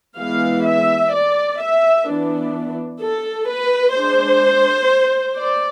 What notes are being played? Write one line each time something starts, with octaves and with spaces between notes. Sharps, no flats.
E3 G#3 B3 F5
E5
D5
E5
E3 B3 D4
A4
B4
G#3 D4 C5
D5